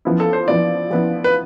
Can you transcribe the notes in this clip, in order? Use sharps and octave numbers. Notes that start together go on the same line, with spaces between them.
F3 B3 E4
A4
C5
F3 B3 E4 D5
F3 B3 E4
B4